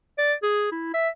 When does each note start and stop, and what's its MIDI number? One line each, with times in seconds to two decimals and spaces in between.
0.18 0.34 74
0.43 0.67 68
0.72 0.90 64
0.94 1.09 76